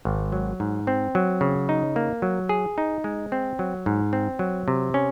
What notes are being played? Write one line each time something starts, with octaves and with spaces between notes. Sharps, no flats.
G#1
F#3
G#2
C4
F#3
C#3
D#4
A#3
F#3
G#4
D#4
G#3
C4
F#3
G#2
C4
F#3
C3
C#4